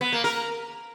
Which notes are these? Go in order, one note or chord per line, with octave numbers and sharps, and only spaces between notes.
B3
A#3
A#4